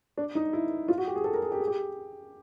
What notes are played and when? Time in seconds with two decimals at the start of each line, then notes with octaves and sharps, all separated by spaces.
0.17 D4
0.35 D#4
0.53 E4
0.88 F4
0.98 F#4
1.07 G4
1.15 G#4
1.24 A4
1.33 A#4
1.42 G#4
1.52 G4
1.59 G#4
1.67 G4